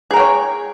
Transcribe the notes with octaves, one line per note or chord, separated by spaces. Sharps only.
G#4 A#4 C#5 G5